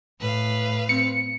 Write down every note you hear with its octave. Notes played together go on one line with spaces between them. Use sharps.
A2 B4 F5
C4 C#7